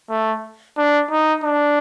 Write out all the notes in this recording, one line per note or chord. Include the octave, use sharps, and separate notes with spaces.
A3
D4
D#4
D4